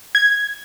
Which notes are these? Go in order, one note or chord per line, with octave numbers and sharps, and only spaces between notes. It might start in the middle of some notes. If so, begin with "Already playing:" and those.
G#6